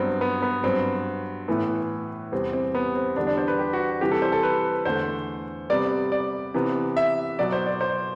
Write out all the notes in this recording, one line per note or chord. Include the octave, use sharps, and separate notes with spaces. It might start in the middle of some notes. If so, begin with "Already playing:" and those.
Already playing: G2 F#3 B3 C4
B3
B3
G2 F#3 B3 C4
A2 E3 A3 B3
E2 C3 G3 B3 C4
C4
B3
C4
E2 D3 G3 B3 D4
D4
C5
B4
G4
F#4
C3 E3 G3 G4
A4
C5
A4
B4
E2 D3 A3 C5
C3 G3 B3 D5
D5
C3 E3 B3
E5
B2 F#3 B3 D5
C5
D5
C5